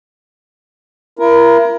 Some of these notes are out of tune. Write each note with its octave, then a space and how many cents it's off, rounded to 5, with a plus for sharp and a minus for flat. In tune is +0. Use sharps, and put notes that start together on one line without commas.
E4 +40 A#4 +20